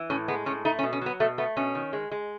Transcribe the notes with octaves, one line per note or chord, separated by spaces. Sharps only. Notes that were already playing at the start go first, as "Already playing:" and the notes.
Already playing: E3
A2 C#4
G#3 B3
A2 C#4
A3 D#4
C#4
B2
C#4
F#3 B3
B2 A3
A3 B3
B2 C#4
D#3
G#3
G#3